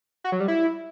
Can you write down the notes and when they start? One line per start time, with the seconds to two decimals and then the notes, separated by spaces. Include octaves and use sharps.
0.24 F#4
0.32 F#3
0.40 G3
0.48 E4